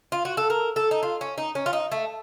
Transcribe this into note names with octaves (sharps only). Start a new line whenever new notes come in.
F4
F#4
A4
A#4
A4
D#4
F4
C#4
D#4
C#4
F4
D#4
A3